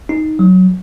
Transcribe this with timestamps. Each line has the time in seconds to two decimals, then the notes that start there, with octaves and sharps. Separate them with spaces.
0.09 D#4
0.39 F#3